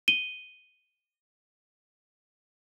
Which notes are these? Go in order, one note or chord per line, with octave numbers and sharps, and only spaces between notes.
D#7 G7